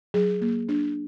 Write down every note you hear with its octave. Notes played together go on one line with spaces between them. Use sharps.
F#3 G#4
A#3
D4